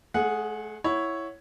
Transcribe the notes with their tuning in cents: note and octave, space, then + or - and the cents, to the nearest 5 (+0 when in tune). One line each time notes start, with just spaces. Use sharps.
A3 -40 G#4 +0 F#5 -15
E4 +0 C#5 +0 F#5 +0